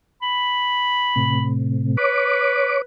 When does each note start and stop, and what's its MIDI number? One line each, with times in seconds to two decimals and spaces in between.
0.22 1.49 83
1.15 1.97 45
1.15 1.97 48
1.97 2.82 71
1.97 2.81 73
1.97 2.81 86